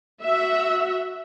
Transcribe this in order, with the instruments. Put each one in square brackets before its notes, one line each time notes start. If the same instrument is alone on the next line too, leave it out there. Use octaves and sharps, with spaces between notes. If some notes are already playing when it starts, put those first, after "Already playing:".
[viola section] F#4 E5